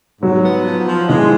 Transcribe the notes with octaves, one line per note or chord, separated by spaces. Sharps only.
G#2 F#3
B3
F3
F3
E3 G#3